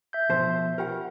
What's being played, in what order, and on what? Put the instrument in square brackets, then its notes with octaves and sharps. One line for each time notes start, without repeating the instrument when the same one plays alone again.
[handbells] E5 G6
[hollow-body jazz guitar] B2 F3 A5 [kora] C5
[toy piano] F4 G4 G5 [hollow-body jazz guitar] A#4 F#5